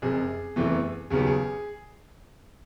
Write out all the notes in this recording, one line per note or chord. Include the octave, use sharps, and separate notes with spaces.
F#1 F2 C3 G#4
F#1 E2 C3 E3 A3
D#2 C#3 F#3 B3 G#4
G4
G#4